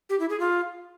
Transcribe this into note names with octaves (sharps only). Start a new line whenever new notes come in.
G4
E4
G#4
F4